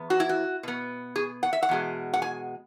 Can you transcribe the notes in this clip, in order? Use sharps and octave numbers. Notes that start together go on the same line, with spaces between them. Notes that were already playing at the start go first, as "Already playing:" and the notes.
Already playing: E2 B3
F#4
E4
F#4
B2 B3
G#4
F#5
E5
F#5
E2 B2 G#3
F#5
G#5